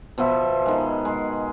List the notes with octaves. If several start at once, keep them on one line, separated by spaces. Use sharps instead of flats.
B2 F3 B3 E5
D#3 G#3
G#3